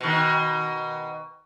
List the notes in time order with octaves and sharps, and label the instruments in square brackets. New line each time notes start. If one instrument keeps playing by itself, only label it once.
[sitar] B2 D#3